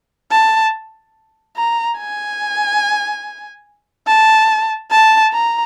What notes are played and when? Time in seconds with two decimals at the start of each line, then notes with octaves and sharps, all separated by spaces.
0.31 A5
1.57 A#5
1.98 G#5
4.07 A5
4.91 A5
5.33 A#5